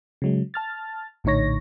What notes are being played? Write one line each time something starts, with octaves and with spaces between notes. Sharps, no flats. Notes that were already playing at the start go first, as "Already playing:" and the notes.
C#3 F#3 G#3
A5 F6 A6
A#1 A2 D3 D#4 C#5 A#6